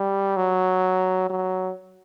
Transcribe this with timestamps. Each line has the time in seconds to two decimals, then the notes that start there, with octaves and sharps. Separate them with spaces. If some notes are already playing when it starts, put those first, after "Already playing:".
Already playing: G3
0.37 F#3
1.30 F#3